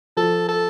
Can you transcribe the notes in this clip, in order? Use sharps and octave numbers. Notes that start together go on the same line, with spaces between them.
F3 A4
A4